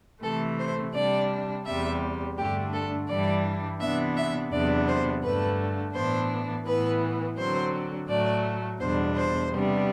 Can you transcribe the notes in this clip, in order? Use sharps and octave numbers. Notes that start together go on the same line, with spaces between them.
C3 E3 A3 A4
C5
C3 G3 D4 D5
E2 C3 G3 E5
G2 D3 A3 D4 G4
A4
G2 E3 G3 D4 D5
C3 E3 B3 D4 E5
E5
E2 C3 F#3 B3 D4 D5
C5
G2 D3 A3 B4
A2 E3 B3 D4 C5
A2 E3 B3 B4
D3 F#3 C4 C5
A2 F#3 A3 D5
E2 B2 G3 D4 C5
C5
C3 G3 B3 D4